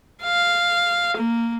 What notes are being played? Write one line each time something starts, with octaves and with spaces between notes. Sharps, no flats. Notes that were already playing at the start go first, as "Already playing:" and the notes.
F5
A#3